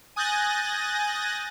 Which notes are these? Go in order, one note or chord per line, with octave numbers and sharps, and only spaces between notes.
G#5 D#6 F#6 G6 A6 A#6